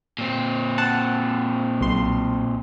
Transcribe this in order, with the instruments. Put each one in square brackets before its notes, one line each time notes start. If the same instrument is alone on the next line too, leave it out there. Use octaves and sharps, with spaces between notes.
[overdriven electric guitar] A#2 C4
[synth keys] F#5 A5
B1 C6